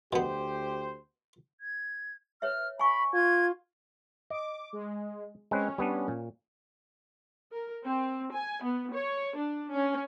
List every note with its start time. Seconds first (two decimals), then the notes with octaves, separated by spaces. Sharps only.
0.13 D2 B2 B3 G4 C5
1.61 G#6
2.42 B4 C#5 E5 F6
2.79 G#5 B5 C#6
3.13 F4 G#6
4.30 D#5 D6
4.73 G#3
5.51 G#3 C4 C#4 B4
5.78 G3 B3 D4
6.08 A#2
7.53 A#4
7.84 C4
8.33 G#5
8.63 B3
8.92 C#5
9.36 D4
9.72 C#4